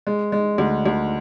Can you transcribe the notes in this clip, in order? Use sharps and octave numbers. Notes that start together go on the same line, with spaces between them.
G#3
G#3
D2
D2